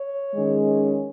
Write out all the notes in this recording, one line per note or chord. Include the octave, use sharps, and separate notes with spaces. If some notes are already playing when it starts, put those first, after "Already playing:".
Already playing: C#5
D#3 G#3 C#4